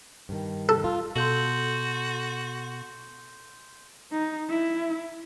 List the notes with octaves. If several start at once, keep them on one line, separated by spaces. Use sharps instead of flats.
G2 D#3
A4
F4
B2 F#4 A4 C6 G6 F#7
D#4
E4